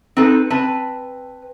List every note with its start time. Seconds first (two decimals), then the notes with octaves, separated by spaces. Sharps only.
0.17 C4 D#4 A4 B4
0.50 C4 B4 A5